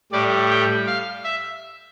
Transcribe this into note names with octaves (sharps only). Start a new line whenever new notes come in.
A2 G3 D5
G5
F5
E5